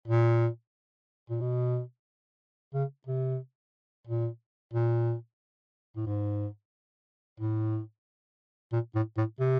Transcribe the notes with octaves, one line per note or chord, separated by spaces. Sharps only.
A#2
A#2
B2
C#3
C3
A#2
A#2
A2
G#2
A2
A#2
A2
A2
C3